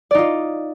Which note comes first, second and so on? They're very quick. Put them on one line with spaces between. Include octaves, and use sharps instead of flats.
D5 D#4 F4